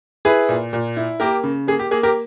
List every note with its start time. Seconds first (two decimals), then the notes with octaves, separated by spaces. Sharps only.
0.25 E4 G#4 B4
0.49 A#2
0.73 A#2
0.97 E4
1.20 A#3 G4 A#4
1.44 C#3
1.68 A#3 G#4
1.79 G4
1.91 A#3 G#4
2.03 G4 A#4